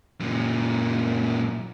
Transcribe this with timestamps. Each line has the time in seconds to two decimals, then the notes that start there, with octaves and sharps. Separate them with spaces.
0.20 F#2 A#2